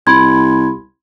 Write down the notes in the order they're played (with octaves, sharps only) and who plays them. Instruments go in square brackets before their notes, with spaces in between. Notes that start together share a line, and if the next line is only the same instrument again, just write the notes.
[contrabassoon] C2 [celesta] B5 C6 G#6